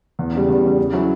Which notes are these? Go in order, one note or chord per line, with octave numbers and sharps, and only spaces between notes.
E2
C#3 G3
E2
C#3 G3
C#3
F#3 C#4 E4